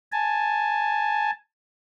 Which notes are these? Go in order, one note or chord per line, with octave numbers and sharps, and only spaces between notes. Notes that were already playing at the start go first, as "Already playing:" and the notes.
G#5 A5